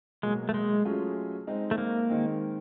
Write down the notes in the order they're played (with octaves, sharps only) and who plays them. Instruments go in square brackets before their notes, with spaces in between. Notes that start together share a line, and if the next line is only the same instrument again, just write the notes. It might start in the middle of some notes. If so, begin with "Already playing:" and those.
[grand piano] B2 F#3 A#3 [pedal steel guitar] G#3
[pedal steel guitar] A3
G#3
[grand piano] F#3 A3 C#4 F4 G#4
G#3 C4 D#4
[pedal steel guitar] A3
A#3
[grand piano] D#3 G#3 C4